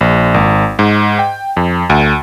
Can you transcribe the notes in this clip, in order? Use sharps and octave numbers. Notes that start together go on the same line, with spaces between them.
A#1
G#1
G#2
G5
F2
D2